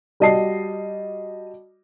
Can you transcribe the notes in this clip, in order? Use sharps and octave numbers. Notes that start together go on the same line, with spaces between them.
G3 F#4 D#5 A5 C7